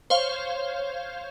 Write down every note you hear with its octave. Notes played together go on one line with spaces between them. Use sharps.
C5 C#5 F5